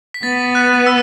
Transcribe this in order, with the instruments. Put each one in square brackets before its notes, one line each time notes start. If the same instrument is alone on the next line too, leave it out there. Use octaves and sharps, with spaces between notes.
[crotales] B6
[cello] B3 [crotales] A6
[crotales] F#6
E6